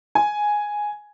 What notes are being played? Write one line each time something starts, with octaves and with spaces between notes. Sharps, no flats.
G#5